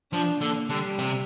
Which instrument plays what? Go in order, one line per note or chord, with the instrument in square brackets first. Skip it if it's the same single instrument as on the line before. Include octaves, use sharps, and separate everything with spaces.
[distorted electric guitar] F3 [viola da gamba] D4
[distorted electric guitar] D3 [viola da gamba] A#3
[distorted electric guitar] D3 [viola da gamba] G3
[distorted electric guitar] C3